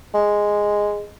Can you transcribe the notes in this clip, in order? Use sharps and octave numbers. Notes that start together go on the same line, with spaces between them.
G#3